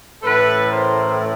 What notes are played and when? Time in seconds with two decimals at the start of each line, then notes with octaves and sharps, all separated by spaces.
0.23 A2 E3 A3 C#4 A4 B4
0.68 A#4 C5